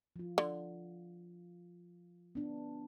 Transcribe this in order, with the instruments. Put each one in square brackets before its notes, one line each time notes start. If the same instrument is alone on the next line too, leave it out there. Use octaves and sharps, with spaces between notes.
[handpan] F3 F4
[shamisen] D3
[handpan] B3 D4